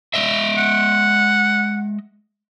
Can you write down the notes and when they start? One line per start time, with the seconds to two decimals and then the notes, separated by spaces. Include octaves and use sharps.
0.14 G#3 D#5 E5
0.57 F#5